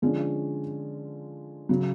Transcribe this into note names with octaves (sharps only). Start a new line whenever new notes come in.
D3 F3 G#3 C#4
C#3 F#3